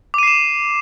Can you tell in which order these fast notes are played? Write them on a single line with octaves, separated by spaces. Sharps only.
D6 D#7 C7 E7